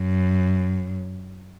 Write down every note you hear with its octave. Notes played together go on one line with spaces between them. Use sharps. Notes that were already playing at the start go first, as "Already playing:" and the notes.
Already playing: F#2